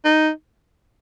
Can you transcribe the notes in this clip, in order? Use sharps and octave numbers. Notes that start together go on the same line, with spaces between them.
D#4